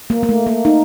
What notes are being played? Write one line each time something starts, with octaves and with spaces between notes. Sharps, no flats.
A#3
A#3
A3
A#3
D#4